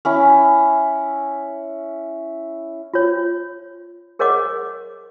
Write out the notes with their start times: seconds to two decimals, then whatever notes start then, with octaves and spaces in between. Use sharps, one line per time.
0.05 C#4 E4
2.94 F4 C#5
4.19 G#4 A#4 C#5 D#5 F#5 D6